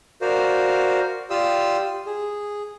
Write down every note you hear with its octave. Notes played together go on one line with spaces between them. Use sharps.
F#4 A#4 C5 D5 F5
F4 G4 D5 F5 D#6 E6
G#4